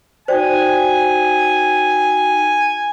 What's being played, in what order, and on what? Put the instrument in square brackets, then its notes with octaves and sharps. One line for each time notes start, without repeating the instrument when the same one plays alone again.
[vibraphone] D#4 F#4 G5 [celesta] C5 D5 [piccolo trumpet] G#5